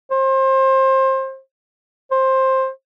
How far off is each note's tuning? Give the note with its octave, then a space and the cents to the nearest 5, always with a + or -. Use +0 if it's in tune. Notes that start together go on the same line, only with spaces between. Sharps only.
C5 +25
C5 +15